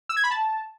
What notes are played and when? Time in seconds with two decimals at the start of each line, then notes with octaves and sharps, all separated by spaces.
0.09 E6
0.16 G#6
0.24 B5
0.31 A5